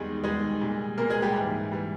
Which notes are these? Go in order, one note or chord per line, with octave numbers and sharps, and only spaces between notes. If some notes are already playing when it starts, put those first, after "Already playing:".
Already playing: E2 D#3 G3 G#3 G#4
E2 D#3 G3 G#3 G#4
A#2 G3
A#2 G3 A#3 A#4
G#3 G#4
G3 G4
G#2 E3 G3
E3 G3